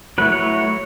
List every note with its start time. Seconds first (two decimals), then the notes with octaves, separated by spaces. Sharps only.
0.18 F#3 A3 E4 B4
0.32 C#5